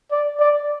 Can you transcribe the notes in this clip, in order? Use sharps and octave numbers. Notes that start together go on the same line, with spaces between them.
D5
D5